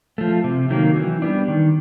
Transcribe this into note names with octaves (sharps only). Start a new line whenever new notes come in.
F3 A3
C3
D#3 F#3 A#3
E3
G3 B3 D4
D#3